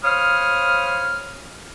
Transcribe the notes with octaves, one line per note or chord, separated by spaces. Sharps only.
C5 C#5 F5 B5 D#6 F6